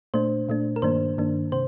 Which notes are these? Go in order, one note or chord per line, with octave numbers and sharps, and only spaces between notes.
A#2 A3 D4 C5
A#2 A3 D4
A#4
G2 D#3 A#3 D4 C5
G2 D#3 A#3 D4
C3 C5